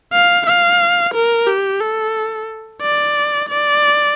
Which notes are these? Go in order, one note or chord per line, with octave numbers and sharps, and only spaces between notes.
F5
F5
A#4
G4
A4
D5
D5